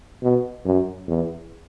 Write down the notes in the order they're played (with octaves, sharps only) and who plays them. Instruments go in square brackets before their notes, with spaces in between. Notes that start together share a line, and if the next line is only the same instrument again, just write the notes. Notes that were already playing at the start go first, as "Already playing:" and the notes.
[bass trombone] B2
F#2
E2